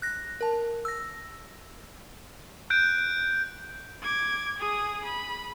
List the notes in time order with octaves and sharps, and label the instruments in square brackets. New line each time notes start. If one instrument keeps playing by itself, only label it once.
[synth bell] F#6 A#6
A#4 A5
E6 A#6
[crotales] F#6 G6 D7
[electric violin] D6 G#6
G#4 D#6
B5